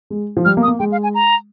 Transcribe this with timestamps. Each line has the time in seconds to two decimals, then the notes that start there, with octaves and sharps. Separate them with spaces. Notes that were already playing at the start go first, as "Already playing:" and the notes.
0.10 G#3
0.37 F3
0.45 G3 F6
0.57 A#3
0.63 D#6
0.68 A#3
0.79 G#3 G5
0.92 F5
1.03 G#5
1.14 A#5